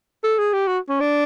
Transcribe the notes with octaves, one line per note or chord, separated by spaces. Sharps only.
A4
G#4
G4
F#4
C#4
D4